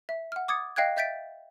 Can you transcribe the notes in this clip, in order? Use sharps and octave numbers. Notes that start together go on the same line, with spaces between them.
E5
F#5 F6
D6 D#6 G#6 A6 C#7
D#5 F5 G5 F#6 G#6
D#5 E5 G6 A6 B6 D7